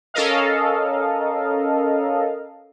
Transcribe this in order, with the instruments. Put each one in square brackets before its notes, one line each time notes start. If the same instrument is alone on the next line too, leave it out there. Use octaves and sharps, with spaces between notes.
[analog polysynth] C#4 A4 A#4 D#5 F5